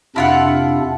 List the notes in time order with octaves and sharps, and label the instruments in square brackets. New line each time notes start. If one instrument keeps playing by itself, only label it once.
[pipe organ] F2 C3 D4 [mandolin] E4 F4 F#5